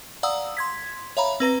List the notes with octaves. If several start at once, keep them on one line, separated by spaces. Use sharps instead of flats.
D5 F5 F#5 A#5 D#6 E6
C6 G#6 B6
C#5 E5 F5 A#5 B5
C4 B4 A#5 A#6